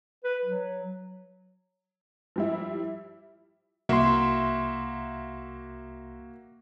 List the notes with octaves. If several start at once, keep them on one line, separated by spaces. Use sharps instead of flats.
B4
F#3
F3 G3 E4
C2 A#3 F#4 E5 C6